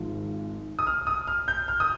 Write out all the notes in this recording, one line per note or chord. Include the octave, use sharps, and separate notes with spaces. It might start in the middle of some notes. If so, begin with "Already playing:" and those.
Already playing: G#1 G#2 F3
D#6
F6
D#6
F6
G6
F6
D#6